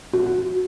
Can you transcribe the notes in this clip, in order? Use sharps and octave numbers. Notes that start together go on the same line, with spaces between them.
F#4